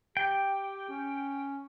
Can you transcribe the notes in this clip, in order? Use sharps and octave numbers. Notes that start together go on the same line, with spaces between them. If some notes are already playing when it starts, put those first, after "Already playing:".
G4 G5
C#4